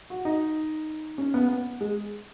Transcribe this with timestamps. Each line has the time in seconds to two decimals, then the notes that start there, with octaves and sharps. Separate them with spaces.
0.10 F#4
0.25 D#4
1.18 C#4
1.34 B3
1.49 B3
1.81 G#3